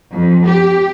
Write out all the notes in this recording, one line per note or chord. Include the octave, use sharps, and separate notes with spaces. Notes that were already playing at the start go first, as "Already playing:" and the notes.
F2
G4